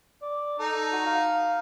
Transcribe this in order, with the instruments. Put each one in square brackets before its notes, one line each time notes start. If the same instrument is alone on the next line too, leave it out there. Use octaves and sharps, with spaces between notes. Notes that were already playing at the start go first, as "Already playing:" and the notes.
[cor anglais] D5
[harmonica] D#4 [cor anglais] A4
[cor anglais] F#4
F5